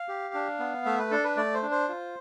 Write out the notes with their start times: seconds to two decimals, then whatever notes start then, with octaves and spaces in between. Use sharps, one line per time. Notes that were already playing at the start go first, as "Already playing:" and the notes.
Already playing: F5
0.08 G4
0.34 D4
0.59 B3
0.86 A3 E5
0.98 B4
1.11 D4 A4
1.24 B4
1.37 A3 D5
1.54 C5
1.63 D4
1.71 C5
1.88 F4